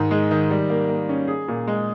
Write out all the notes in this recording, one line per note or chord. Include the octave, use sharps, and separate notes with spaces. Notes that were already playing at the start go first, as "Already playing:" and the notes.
Already playing: G#2 D#3
G#3
D#3
G3
A#3
A#3
C#4
G#4
A#2
G#3